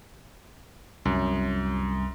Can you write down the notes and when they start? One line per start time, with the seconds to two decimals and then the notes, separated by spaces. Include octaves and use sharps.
1.05 C2 F#2